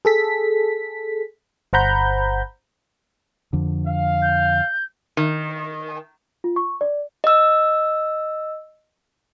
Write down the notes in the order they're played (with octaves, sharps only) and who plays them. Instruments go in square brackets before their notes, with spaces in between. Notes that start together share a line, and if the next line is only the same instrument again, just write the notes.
[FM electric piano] G#4 A4 B6
G1 C5 F#5 A#5 B5 G6
[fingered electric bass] F2 D3
[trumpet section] F5
[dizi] G6
[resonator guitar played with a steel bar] D#3
[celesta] F4
C#6
D5
[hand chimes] D#5 E6